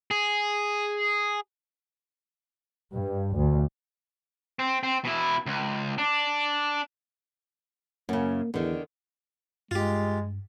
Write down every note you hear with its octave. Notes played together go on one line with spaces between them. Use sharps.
G#4
G2
D2
C4
C4
B2 E4
C#2
D4
F#2 C#3 A#3
E2 D3 D#3
G2 G#3 F4 G4